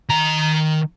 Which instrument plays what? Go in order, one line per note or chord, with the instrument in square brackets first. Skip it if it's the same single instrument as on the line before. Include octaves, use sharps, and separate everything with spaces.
[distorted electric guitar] D#3 A#5